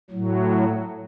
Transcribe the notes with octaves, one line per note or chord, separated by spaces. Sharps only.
A2 F#3